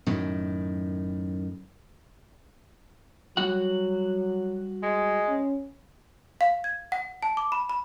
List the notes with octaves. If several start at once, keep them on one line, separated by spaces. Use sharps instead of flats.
F#2 A2 D#3
F#3 G3 F#4 F#5
G#3
C#4
F5
G#6
F#5
A5
D6
B5
B5